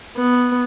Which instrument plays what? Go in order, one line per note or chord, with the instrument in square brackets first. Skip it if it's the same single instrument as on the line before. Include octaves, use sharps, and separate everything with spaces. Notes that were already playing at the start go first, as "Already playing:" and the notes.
[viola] B3